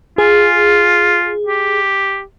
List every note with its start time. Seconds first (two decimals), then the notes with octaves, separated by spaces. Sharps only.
0.18 F4 G#4
1.47 G4